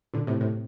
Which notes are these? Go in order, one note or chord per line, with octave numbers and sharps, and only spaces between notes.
A#2 D3
A2 C3
A2 C3